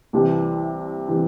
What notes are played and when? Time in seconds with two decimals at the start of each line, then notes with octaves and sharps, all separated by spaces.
0.13 C2 C3 E3
1.08 C3 E3